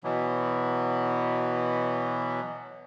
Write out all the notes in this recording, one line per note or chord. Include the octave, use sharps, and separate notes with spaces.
B2 E3 F#3